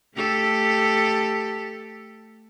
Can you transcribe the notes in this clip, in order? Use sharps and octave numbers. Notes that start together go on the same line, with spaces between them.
A3 G4 A4